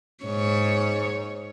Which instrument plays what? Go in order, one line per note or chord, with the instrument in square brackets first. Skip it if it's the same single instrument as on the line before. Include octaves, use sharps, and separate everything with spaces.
[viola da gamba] G#2 C#5